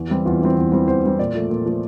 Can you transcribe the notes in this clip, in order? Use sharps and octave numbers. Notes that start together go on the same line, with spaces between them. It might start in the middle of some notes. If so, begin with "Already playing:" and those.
Already playing: E2
E3 G3 C4
E2 F4
E3 G3 C4
E2
E3 G3 C4
E2 C5
E3 G3 C4
A#2 D5
F3 A3
A#2
F3 A3